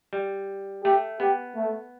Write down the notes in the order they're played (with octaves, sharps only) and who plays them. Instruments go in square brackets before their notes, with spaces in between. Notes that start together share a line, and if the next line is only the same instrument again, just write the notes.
[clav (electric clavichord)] G3
[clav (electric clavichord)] A3 [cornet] G4
[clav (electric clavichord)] B3 [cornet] G4
[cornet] A3